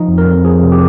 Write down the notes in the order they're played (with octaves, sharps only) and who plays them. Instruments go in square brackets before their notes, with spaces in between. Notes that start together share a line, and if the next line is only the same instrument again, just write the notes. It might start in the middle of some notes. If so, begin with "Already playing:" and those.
Already playing: [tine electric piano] F3 D#4
F2
A#4
F2
F3 G#4
C3
G4